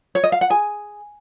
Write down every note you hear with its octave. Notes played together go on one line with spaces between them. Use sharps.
C#5
D#5
F5
F#5
G#4 G#5